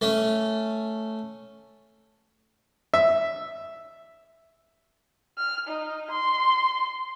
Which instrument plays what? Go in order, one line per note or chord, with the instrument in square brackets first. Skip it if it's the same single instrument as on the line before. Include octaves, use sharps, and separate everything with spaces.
[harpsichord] A3 C#4
[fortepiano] E5
[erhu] F6
D#4
C6